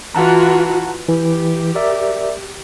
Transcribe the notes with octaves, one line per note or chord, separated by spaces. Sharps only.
E3 F4 F#4 F#5 A5 A#5
E3 G4
A#4 D5 E5